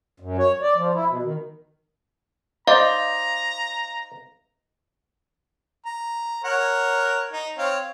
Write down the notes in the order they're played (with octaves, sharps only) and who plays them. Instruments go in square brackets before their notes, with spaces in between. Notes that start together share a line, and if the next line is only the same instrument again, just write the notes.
[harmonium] F#2
C#5
D5
F3
E4
B2
D#3
[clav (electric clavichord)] D#4 C5 D5 [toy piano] D#5 [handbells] F5 [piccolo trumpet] A#5
[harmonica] A#5
A#4 C#5 F#5
D#4
C4 C#5 F5